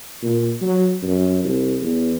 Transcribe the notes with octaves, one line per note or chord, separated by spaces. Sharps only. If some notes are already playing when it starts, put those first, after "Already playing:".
A#2
F#3
F#2
C2
E2